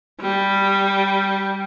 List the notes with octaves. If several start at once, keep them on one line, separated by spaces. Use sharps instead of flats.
G3